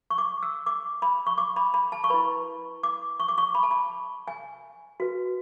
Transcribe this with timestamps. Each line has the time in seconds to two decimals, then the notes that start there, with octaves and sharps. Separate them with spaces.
0.10 C#6
0.18 D6
0.43 E6
0.66 D6
1.02 B5
1.26 C#6
1.38 D6
1.56 B5
1.74 B5
1.92 A5
2.04 C#6
2.10 E4 B4 B5
2.83 D6
3.20 C#6
3.28 D6
3.38 C#6
3.55 B5
3.63 A5
3.71 B5
4.28 G#5
5.00 F#4 B4